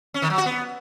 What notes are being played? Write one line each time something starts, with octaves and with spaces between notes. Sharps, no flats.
C#4
D#3
F#3
F#4
B3